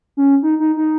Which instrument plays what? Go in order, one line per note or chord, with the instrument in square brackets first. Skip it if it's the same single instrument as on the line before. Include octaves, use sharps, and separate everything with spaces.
[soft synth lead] C#4
D#4
D#4
D#4